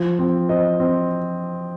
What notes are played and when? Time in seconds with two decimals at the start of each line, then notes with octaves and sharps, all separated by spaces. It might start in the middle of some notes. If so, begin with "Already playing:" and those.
Already playing: F3
0.19 C4
0.49 C4 C5 D#5
0.80 C4